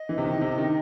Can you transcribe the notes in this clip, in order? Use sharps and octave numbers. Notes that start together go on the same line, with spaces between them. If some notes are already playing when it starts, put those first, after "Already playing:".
Already playing: D#5
E3
C3
D#3
C3
D#3